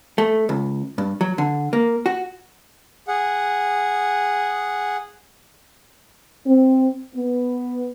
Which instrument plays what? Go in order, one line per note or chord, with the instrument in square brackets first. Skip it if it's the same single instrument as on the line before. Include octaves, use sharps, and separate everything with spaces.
[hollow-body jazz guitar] A3
C#2
G2
F#3
D3
A#3
F#4
[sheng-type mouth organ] G#4 F#5
[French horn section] C4
B3